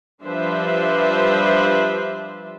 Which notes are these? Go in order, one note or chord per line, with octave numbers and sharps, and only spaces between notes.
F3 G3 D4 B4 C5 E5